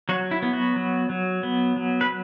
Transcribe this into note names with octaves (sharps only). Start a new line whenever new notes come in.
F#3 F#4
E4
B3
F#4
F#3
F#3
B3
F#3
B4